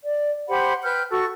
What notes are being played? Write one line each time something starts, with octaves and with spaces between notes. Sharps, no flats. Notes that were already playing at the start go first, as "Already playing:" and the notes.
D5
G4 C5 F#5 B5
B4 G5 F6 G6
F#4 A4 C#6